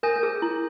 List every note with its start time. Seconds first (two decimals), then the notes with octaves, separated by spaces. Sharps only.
0.03 A#4 G#5 D#6 G6 A#6
0.16 A#4
0.23 G#4
0.42 E4